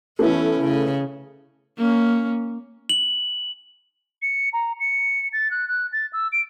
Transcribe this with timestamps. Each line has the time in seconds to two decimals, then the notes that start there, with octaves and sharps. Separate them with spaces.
0.19 E3 A3 B3 C#4 E4
0.59 C#3
1.78 A#3 C#4
2.89 F#7
4.22 C#7
4.53 A#5
4.80 C#7
5.33 A6
5.51 F#6
5.68 F#6
5.92 A6
6.13 E6
6.32 D7